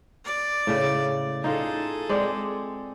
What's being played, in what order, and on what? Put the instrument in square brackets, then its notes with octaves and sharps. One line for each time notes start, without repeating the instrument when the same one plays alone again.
[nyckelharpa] D5
[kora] A2 C#3
[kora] D#4 F4 [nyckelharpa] G#4 A4
[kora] G#3 C4 D5